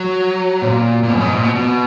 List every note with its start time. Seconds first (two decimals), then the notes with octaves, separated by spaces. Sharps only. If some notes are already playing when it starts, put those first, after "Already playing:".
Already playing: F#3
0.62 A#2
1.03 A#2
1.09 B2
1.15 F#2
1.20 G#2
1.32 A#2
1.44 B2
1.55 B2